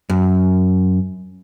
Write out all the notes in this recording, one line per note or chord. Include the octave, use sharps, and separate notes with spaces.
F#2